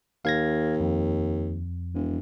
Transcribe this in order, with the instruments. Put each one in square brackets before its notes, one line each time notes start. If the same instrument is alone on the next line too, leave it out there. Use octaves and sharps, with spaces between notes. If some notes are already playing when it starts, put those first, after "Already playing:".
[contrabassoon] D#2 [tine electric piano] F5 G#6 A#6
[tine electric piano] F2
[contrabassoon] E1